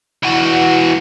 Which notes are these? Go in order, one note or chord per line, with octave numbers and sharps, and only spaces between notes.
E3 F#4